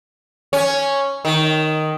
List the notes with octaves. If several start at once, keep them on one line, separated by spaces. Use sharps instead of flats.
C#4
D#3